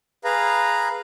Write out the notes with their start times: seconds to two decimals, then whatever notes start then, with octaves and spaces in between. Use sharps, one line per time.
0.24 G#4 B4 F5 A#5